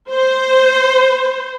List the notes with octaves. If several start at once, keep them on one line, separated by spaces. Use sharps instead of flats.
C5